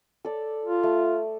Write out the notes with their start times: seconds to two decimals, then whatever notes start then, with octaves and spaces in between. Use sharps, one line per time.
0.25 A4 D5
0.65 F4
0.83 A3